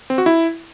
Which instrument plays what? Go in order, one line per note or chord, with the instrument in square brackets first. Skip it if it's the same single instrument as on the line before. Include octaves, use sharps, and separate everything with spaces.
[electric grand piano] C4
F#4
E4